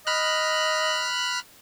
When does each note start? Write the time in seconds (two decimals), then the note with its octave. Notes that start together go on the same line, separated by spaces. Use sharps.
0.07 D#5 B5 F6 F#6